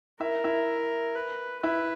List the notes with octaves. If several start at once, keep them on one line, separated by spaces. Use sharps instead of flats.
E4 A#4 E5
E4 E5
B4
E4 B4 E5